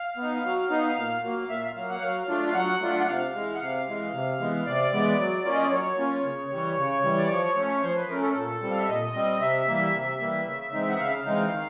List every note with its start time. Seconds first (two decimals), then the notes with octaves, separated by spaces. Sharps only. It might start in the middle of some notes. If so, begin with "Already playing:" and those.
Already playing: F5
0.17 B3 D#4
0.44 F#3
0.70 B3 D#4
0.97 A#2
1.23 F#3 A#3
1.49 A#2 E5
1.62 F5
1.76 F#3 A#3 F5
1.89 F#5
2.02 F#3 F5
2.29 A3 D4 F4
2.50 F5
2.54 F#3 F#5
2.81 A3 D4 F4
3.00 F#5
3.07 C3 F5
3.34 E3 G#3
3.55 F#5
3.61 C3 F5
3.86 E3 G#3
4.13 C3
4.40 E3 G#3 B3
4.66 C3 D5
4.92 E3 G#3 B3
5.19 F#3
5.45 A#3 C#4 F4
5.54 D#5
5.62 D5
5.71 F#3 C#5
5.98 A#3 C#4 F4
6.24 C#3
6.51 E3 G3
6.77 C#3
7.03 E3 G3
7.18 D5
7.29 F3 C#5
7.56 A3 C#4
7.83 F3 C5
7.96 B4
8.09 A3 C#4 A#4
8.22 A4
8.35 A#2 A4
8.62 G3 C4
8.71 F5
8.79 E5
8.88 A#2 D#5
9.15 G3 C4
9.41 C3 E5
9.67 E3 G3 A#3
9.93 C3
10.20 E3 G3 A#3
10.46 C#3
10.73 E3 G#3 C4 D#4
10.89 F#5
10.99 C#3 F5
11.25 E3 G#3 C4 D#4
11.52 D#3